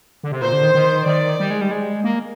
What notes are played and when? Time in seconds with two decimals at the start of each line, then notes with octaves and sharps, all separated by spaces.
0.23 D3
0.32 C3
0.41 A#2 C5
0.53 D3
0.63 D#3
0.75 D#3
1.06 D#3 D5
1.40 G3
1.51 G#3
1.61 G3
1.71 G#3
2.04 A#3